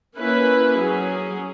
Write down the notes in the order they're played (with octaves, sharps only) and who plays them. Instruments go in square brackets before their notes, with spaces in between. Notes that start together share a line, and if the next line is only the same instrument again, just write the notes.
[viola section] A#3 C#4 E4 B4
F#3 C#4 G#4